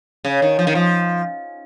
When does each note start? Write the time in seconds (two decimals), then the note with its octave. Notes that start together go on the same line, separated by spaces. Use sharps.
0.25 C#3
0.42 D#3
0.59 F3
0.67 D#3
0.75 F3